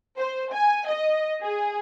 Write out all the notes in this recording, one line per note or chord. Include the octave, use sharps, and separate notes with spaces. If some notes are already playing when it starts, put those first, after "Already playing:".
C5
G#5
D#5
G#4